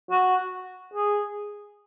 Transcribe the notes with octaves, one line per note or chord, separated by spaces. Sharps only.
F#4
G#4